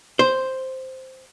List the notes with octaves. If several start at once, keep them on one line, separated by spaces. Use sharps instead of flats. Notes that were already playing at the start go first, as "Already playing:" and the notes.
C5